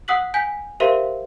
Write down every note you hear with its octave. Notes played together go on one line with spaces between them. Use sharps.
F#5 D#6 E6 F#6 B6 F#7
G#5 G6 B6
G4 A#4 C5 E5 F5 C6